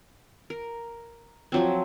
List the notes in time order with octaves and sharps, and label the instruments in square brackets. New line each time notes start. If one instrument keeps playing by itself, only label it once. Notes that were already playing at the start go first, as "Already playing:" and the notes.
[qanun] A#4
F3 F#3 C4